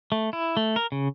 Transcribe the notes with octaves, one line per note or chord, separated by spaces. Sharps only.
A3
E4
A3
A#4
C#3